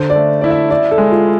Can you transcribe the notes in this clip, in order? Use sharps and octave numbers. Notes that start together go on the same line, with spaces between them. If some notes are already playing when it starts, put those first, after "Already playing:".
Already playing: D3 C5
D5
A3
E4 D5
E5
E4 D5
A4
G#3
F4